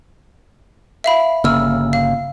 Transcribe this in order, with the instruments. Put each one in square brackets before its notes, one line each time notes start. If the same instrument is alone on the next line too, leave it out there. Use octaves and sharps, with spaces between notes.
[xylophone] E5 F5 B5
[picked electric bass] G1 C#3 A#3 [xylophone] E6 F6
[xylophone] F5